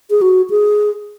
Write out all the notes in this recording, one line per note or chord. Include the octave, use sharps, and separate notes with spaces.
G#4
F#4
G#4